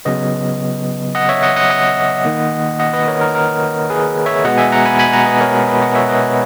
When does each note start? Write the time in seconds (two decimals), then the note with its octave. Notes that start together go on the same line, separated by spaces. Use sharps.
0.05 C#3 F#3 B3 B4 D#5
1.15 D#5 F#5
1.29 C#5 E5
1.43 D#5 F#5
1.56 D#5 F#5
1.70 D#5 F#5
2.25 D#3 A#3
2.80 D#5 F#5
2.93 B4 D#5
3.07 A#4 C#5
3.21 A#4
3.35 A#4
3.90 G#4 B4
4.26 C#5 E5
4.44 B2 G#3 B3 D#5 F#5
4.58 E5 G#5
4.72 F#5 A#5
4.85 G#5 B5
4.99 G#5 B5
5.13 F#5 A#5
5.26 B4 D#5
5.41 A#4 C#5
5.68 B4 D#5
5.82 D#5 F#5
5.95 C#5 E5
6.08 B4 D#5